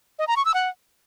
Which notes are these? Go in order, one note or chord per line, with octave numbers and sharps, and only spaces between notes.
D#5
A#5
C#6
E6
F#5